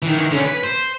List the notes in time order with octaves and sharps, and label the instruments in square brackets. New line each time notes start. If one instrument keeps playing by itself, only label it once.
[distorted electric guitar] D#3 E3
D3 C#4
B4
C5